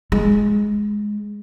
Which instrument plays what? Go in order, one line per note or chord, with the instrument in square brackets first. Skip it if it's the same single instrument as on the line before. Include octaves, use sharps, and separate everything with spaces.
[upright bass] G#3